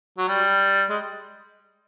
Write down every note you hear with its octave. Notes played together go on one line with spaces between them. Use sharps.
F#3
G3
G#3